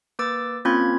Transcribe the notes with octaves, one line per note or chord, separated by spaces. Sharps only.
A#3 B4 D6 E6 A6
A#3 C4 C#4 F4 B5 G#6